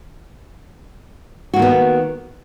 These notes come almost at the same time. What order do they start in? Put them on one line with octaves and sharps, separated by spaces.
F#4 A#3 D#3 B3